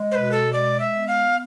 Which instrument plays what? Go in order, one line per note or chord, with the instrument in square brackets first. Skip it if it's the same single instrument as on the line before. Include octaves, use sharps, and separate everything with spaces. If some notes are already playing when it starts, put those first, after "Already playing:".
Already playing: [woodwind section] G#3
[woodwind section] B2 [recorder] B4 C5
[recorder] A4
[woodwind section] G#3 [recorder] D5
[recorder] E5
[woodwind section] B3
[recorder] F5